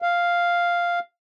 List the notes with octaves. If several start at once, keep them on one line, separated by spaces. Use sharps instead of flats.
F5